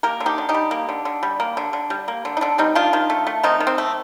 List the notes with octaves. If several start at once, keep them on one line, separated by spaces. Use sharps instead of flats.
A#3 G4 A#4
D3
D#4 G4
D3
D#4 G4
G3
A#3
D3
D3
G3
A#3
D3
D3
G3
A#3
D3
D#4
D3 D4
G3 C4 D#4
D#3 D4 F4
D#3
A3
A3
D#3 C4 D#4
D#3
C4
A3